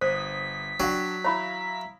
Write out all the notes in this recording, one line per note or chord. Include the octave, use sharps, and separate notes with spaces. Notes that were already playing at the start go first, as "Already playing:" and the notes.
G1 C5 D#6 B6
F#3 D4 F#5 G5
E4 C#5 F5 A#5 B5